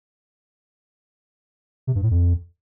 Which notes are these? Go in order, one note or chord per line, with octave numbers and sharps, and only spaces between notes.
C3
G2
A2
F2